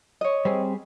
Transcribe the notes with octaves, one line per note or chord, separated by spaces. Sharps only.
C#5 D#5
G3 C4 G#4